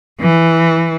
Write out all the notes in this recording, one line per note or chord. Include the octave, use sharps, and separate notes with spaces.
E3